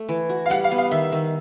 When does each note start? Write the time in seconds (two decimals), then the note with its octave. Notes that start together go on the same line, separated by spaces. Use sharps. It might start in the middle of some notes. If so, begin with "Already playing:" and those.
Already playing: A3
0.09 E3
0.30 F#4
0.46 F5
0.50 G3 F#5
0.64 F5
0.71 B3
0.78 F5
0.91 D#3 E5
1.12 D#3